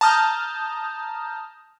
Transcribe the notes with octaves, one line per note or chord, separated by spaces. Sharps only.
A5 A#5 D#6 F6 G6